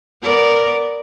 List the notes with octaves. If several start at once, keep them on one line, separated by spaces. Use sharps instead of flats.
B3 A#4 D5